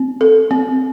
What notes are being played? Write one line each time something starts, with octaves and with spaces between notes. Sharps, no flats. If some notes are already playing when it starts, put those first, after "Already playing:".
Already playing: C4
A4
C4